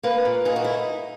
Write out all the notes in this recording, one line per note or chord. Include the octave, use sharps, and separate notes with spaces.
A#3 B4
A#2
D#4 G#4
F#4
E4